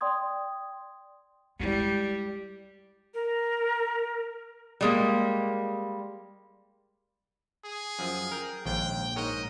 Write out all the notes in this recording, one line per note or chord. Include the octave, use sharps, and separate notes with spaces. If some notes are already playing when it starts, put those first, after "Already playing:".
D5 G5 C6 D#6 G#6
G3 G#3 E4
A#4
G3 G#3 A#3
G#4
F#2 F3
A#4 G5
A#1 D#2 G#2 G5
G#2 A#4 C#5 D#5